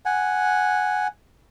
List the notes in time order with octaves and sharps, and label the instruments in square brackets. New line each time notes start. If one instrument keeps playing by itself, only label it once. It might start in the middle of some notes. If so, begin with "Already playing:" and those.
[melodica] F#5 G#5